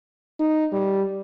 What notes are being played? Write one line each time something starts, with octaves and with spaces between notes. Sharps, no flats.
D#4
G3